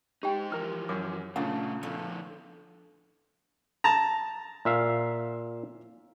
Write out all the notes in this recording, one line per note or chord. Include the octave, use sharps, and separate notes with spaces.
G#3 D#4 G4 G5
E3 F3 A#4 F6
F#2 D6
A#2 C#3 A3 A#3 D4 D#4 F#5
D3 F3 A3 B3 E4
A5 A#5
A#2 E5 F5